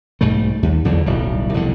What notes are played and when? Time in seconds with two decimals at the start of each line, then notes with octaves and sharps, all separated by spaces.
0.21 B1 G#2 G3 A3
0.63 D#2
0.85 E2 D3 F#3
1.06 D1 B1 G3
1.54 C2 F2 B2 D3